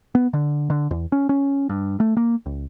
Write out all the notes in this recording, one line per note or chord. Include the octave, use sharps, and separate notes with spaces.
B3
D3
D3
E2
C#4
C#4
G2
A3
A#3
C#2